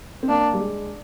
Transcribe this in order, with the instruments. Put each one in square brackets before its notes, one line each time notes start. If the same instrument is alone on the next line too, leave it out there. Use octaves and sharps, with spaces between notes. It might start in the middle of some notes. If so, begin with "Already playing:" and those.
[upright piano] C4
[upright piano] A#3 [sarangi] D4
[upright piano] G3
G#3